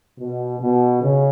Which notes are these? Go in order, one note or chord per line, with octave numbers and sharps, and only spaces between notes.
B2
B2
C#3